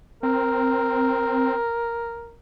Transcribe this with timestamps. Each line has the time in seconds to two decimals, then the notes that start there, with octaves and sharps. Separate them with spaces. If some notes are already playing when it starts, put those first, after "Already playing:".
0.23 C4 A#4